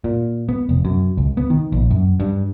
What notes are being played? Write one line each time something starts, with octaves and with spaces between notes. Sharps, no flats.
A#2
B3
F1
F#2
C#2
B3
D#3
A#1
F#2
G2